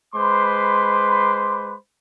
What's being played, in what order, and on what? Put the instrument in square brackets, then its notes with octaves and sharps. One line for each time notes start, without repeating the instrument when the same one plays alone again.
[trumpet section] G#3 B4 C5 B5 C6 D6